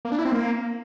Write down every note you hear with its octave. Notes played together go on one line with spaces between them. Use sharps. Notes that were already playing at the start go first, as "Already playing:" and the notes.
A#3
D4
E4
C4
A#3